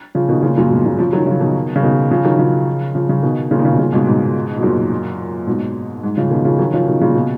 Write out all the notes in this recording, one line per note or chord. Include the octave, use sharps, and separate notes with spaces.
C#3 F3
B2 D#3
A#2 C#3
F#2 A#2
G#2 B2
A#2 C#3
C#3 F3
D#3 F#3
C#3 F3
B2 D#3
C#3
B2 D#3
C#3 F3
D#3 F#3
C#3 F3
C#3 F3
C#3 F3
B2 D#3
A#2 C#3
D#3
A#2 C#3
B2
A#2 C#3
G#2 B2
G#2 B2
B2
F#2 A#2
G#2 B2
G#2
C#3 F3
B2 D#3
C#3 F3
D#3 F#3
C#3 F3
B2 D#3
A#2 C#3
B2